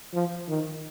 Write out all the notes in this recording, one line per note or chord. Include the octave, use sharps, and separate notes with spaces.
F3
D#3